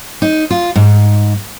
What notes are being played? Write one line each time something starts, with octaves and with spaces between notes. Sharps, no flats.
D#4
F4
G#2